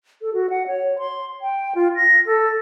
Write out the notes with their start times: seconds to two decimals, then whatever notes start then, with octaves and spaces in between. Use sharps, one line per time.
0.21 A4
0.34 F#4
0.50 F#5
0.67 C#5
0.99 C6
1.42 G5
1.75 F4
1.96 A#6
2.26 A4